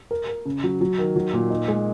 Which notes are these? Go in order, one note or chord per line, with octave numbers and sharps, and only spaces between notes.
A#4
A#4
C#3
F#3
F#3
D#3
F#3
A#2
D#4
G#3